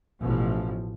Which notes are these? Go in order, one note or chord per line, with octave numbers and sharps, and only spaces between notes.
A1 B2 F3